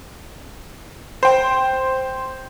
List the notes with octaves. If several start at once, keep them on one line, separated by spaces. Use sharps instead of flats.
C5 G5